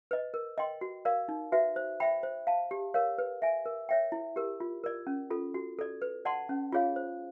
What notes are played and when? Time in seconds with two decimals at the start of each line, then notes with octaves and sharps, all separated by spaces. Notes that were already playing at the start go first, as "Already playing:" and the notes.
0.11 B4 D#5
0.34 A#4
0.58 D#5 G5 C6
0.81 F#4
1.05 A#4 D5 F5
1.29 D#4
1.52 F#4 B4 E5
1.76 C5
2.00 E5 G5 B5
2.23 C5
2.47 F5 A5
2.71 G4
2.94 A#4 C#5 F5
3.18 B4
3.42 E5 G#5
3.66 A#4
3.89 C#5 E5 G5
4.12 E4
4.36 G4 A#4
4.60 F4
4.84 A#4 D5
5.07 C#4
5.31 F4 A4
5.54 F#4
5.79 A4 D5
6.02 B4
6.25 D5 F#5 A5 C6
6.49 C#4
6.72 F4 G#4 C#5 F5
6.96 C5